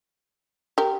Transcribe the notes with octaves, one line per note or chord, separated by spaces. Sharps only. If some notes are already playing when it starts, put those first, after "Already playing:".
G4 A#4